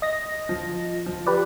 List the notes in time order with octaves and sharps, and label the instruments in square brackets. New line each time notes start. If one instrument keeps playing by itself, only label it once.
[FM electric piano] D#5 A#6
[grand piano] F3
F3
[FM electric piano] G4 B4 D5